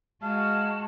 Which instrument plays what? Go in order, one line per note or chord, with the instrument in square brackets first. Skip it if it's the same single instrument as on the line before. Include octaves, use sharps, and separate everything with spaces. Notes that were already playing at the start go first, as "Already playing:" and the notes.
[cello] G#3 F#4 [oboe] F5 [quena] A5